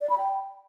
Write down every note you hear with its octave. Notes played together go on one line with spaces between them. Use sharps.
D5
B5
G5